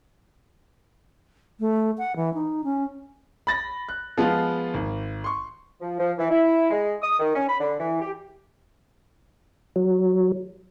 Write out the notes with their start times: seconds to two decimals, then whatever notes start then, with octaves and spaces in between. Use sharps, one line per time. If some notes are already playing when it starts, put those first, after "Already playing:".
1.60 A3
1.98 F#5
2.16 E3
2.34 D#4
2.64 C#4
3.47 B5 A6 A#6
3.89 F#6
4.18 F3 G#3 B3 F4 F5
4.74 G#1
5.24 C6 C#6
5.81 F3
5.99 F3
6.18 E3
6.30 E4
6.70 G#3
7.02 D#6
7.20 D#3
7.35 C#4
7.49 B5
7.60 D3
7.80 E3
8.01 G4
9.76 F#3